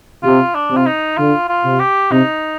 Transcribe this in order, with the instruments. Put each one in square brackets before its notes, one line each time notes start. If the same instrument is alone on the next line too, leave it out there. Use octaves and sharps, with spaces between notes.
[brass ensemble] C3 [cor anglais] F4
[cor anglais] D4
[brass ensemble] C3
[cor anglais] F4
D#4
[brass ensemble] D3 [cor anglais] F4
[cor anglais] F4
[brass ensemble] C3
[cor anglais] G4
[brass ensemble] C3 [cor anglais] D#4